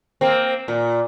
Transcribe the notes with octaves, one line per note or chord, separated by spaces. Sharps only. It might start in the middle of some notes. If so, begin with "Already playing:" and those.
A#3 C4
A#2